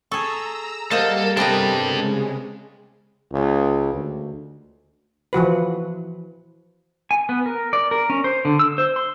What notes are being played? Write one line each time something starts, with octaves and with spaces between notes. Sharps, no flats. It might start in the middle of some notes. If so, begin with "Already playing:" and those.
G#4 A4 A#5 C#6 E6
G3 A#3 A4 A#4 C5 D#5 F#5
C3 B3 D4 A4 D#5 G5 A#5
C#3 G#3
C#2
D2
E3 F3 F#4 B4
G#5
B3
A#4
D5
A#4
C#4
C5
D3
E6
C5
C6